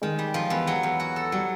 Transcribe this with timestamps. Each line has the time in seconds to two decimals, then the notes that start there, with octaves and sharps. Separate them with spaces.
0.02 D#3 G#3
0.19 G3
0.34 F3
0.50 E2
0.67 F#3
0.83 E2
1.00 F#4
1.16 A4
1.32 F#3 G3